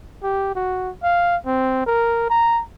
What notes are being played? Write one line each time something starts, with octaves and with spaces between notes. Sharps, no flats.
G4
F#4
F5
C4
A#4
A#5